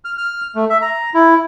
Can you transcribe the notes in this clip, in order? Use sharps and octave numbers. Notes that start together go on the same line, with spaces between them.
F6
F6
A3
E5
A#5
E4